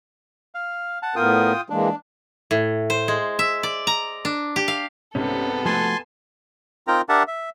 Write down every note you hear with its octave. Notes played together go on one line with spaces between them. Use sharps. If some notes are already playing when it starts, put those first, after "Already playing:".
F5
F#5 A5
A2 B3 F4 A#4 G5 D#6
E3 G#3 A#3 D4
A2
C5
G#3
E5
D5
A#5
D4
G4
F5
C2 G#2 C3 B3 C#4 A4
F3 A3 F#4 G#5 A5 C6
C4 D#4 F4 A#4 G5 A#5
D4 G4 A#4 E5 F#5 A5
E5